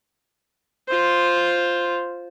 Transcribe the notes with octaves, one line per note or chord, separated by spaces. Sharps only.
F4 C5